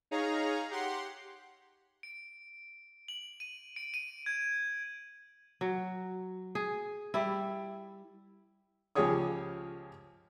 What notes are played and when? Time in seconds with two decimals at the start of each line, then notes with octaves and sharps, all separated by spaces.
0.11 D#4 G#4 C#5 F5 A#5
0.71 G4 F#5 C6
2.03 D7
3.08 F#7
3.40 D#7
3.76 D7
3.94 D#7
4.26 G#6
5.61 F#3
6.55 G#4
7.14 G3 E4
8.95 C#2 F3 G4 G#4 C#5 D#6